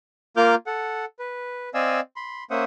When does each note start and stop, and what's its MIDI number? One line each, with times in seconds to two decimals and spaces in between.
0.37 0.55 58
0.37 0.55 65
0.37 0.55 70
0.37 0.55 86
0.37 0.55 89
0.37 0.55 91
0.67 1.05 69
0.67 1.05 78
1.19 1.69 71
1.74 2.00 60
1.74 2.00 74
1.74 2.00 75
1.74 2.00 77
1.74 2.00 80
1.74 2.00 88
2.16 2.44 83
2.16 2.44 84
2.50 2.65 58
2.50 2.65 61
2.50 2.65 72
2.50 2.65 76
2.50 2.65 78
2.50 2.65 87